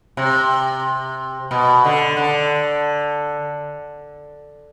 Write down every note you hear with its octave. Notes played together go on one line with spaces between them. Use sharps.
C3
B2
D3
D3